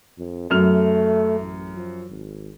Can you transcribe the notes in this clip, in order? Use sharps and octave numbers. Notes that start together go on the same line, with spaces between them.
F2
F#2 A3 F6 F7
A1
F3
G#1